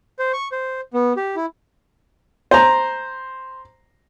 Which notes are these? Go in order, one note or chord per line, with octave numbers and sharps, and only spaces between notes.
C5
C#6
C5
B3
G4
E4
C5 A#5